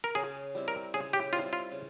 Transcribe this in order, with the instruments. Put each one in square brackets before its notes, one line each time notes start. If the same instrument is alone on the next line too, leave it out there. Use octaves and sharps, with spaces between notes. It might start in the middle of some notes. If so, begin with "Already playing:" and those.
[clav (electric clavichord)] A#4
[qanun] C#3 [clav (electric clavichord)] G#4
[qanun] G3 C4 E4
[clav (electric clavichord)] A#4
[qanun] C#3 [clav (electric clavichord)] G#4
[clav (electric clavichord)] G4
[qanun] G3 C4 E4 [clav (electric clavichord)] F4
[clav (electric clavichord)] F4
[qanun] C#3